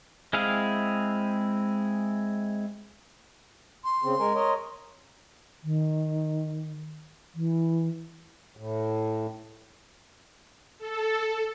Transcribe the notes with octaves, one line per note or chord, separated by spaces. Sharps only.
G#3 C4 E4 G#4 F5
C6
C#3 C4
G#3 A#4 G#5
A#4 C#5 D#5
D#3
E3
A2
A4